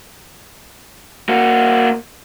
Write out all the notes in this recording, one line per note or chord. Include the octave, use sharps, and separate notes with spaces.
A#3 F#4